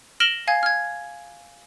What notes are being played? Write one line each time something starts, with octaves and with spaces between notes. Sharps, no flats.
F6 A#6 D7 E7 F#7 G7
F5 G#5 G#6
F6 G#6